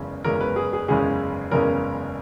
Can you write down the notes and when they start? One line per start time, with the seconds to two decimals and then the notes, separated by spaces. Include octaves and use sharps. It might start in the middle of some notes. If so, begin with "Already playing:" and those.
Already playing: F#1 E2 C#3 G#3 C#4
0.24 F#1 E2 C#3 G#3 C#4 A#4
0.41 B4
0.56 G#4
0.73 G#4
0.88 F#1 E2 C#3 G#3 C#4 G#4
1.51 F#1 E2 C#3 G#3 C#4 A#4